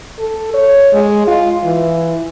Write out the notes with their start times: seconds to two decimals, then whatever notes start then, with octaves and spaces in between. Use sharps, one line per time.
0.19 A4
0.54 C#5
0.93 G#3
1.28 F4
1.64 E3